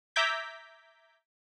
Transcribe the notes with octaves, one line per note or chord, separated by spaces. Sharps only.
E5 A#5 D6 G6 G#6 B6